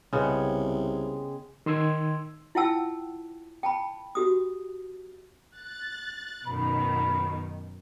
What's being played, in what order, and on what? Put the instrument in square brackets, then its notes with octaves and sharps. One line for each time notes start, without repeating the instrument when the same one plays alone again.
[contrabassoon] C2 [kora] C#3 B3 [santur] G#3 G#4 G5
[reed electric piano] D#3 C6 E6 G#6
[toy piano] E4 F4 F#5 G5 A5 E6
G5 A5 B5
F#4 G4 D#6
[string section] F#6 A6
[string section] F#2 B2 D#3 [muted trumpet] B5